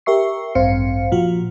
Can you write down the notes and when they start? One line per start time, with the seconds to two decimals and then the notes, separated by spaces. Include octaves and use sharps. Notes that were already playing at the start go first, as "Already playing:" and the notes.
0.06 G4 A#4 E5 C#6 C7
0.55 A1 G2 C4 C5 F5 C#7
1.11 A#2 F3 F4 F#4